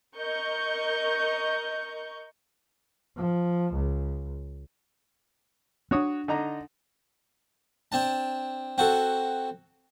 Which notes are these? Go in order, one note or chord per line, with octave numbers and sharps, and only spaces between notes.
A#4 D#5 C#6 G6
F3
C#2
C4 D4 F#4 C#5 D#6
D3 D#4 A#5
C4 D4 A5
C4 F#4 A4